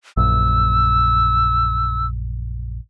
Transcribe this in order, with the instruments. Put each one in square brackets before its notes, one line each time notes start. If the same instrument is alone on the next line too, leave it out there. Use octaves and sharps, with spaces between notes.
[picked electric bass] A#1 F#2 [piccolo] E6